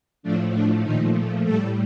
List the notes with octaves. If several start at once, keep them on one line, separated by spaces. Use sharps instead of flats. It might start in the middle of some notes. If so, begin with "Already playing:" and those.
A2 F3 A3 D4
D4
A#2 D#3 F3 A3 D#4
A2 G3 A3 A4